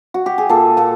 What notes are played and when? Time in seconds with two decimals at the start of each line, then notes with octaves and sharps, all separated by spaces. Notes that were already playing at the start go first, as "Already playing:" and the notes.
0.14 F#4
0.26 G4
0.38 G#4
0.49 A#2 A4
0.77 A#2 A4